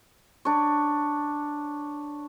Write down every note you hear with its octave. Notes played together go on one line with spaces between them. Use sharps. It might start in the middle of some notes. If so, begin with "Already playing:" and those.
D4 C#5